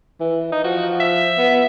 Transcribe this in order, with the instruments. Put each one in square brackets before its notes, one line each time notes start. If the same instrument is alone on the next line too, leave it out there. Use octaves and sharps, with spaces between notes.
[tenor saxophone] E3
D#4
[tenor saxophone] F3 [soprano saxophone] F#4
[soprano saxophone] E5
[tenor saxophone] B3